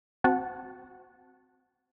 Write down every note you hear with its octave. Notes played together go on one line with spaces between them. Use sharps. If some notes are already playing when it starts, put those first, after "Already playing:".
C4 F#4 F#5 A5